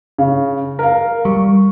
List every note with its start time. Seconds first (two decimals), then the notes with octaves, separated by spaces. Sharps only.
0.18 C#3
0.79 A#4 F5
1.25 G3 C#6